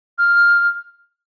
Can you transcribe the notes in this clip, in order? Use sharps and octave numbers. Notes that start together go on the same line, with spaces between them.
F6